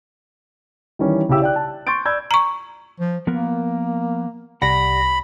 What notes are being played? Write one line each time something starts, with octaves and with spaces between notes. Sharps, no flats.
D#3 E3 G3 C#4
C#3 C#4 E4 G4 E6
D5 G5 F#6
A5
C6 C#6 G6 A6 D7
D5 B5 E6 G6 G#6
A#5 C#6
F3
F3 A#3 B3 A#4
C2 G4 D5 F#5 B5 A#6